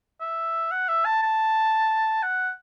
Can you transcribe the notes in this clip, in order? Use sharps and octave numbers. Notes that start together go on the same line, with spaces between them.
E5
F#5
E5
A5
A5
F#5